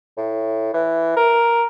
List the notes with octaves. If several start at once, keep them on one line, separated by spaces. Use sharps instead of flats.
A2
E3
A#4